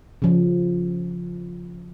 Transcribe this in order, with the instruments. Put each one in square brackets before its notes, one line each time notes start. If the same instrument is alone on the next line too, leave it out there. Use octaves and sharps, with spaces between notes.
[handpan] C#3 F3